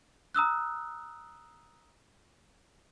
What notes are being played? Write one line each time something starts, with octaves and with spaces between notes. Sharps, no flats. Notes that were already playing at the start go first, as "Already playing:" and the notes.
A#5 D#6 E6 F#6